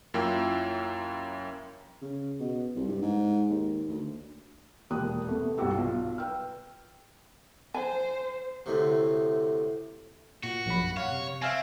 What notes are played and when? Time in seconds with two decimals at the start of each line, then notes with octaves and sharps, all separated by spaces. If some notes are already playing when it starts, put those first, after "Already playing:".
0.14 F#2 A#3 E4 F4 G5 E6
2.02 C#3
2.40 B2
2.76 C2
2.88 G2
3.02 G#2
3.49 D#2
3.89 D2
4.90 E1 D#2 A#2 G4 D#6 F#6
5.27 C3 A3 B3
5.58 C2 G2 B3 F#4 G4 E6
5.74 B1 F4
6.18 B4 G5 E6 F6
7.74 C5 G#5
8.66 D2 A2 C3
10.43 A#2 F#4
10.66 A#1 F#3 B5
10.81 F#2
10.97 C#5 F5 F#5
11.11 C3
11.42 C4 E5 F5 G#5